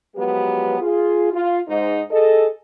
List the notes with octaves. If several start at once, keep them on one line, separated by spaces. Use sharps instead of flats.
F3 F#3 G#3 B3 G4 B4
F4 G#4
F4
G#2 D#4
G#4 A4 D#5